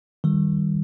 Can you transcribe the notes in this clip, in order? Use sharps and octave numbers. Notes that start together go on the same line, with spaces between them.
D#3 G3